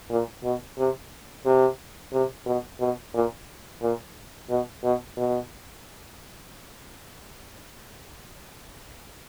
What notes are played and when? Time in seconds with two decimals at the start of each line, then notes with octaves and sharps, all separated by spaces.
0.10 A#2
0.44 B2
0.78 C3
1.46 C3
2.13 C3
2.46 B2
2.80 B2
3.14 A#2
3.82 A#2
4.49 B2
4.84 B2
5.17 B2